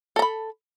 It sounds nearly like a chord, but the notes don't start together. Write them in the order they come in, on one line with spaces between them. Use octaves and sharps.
A4 A#5 B5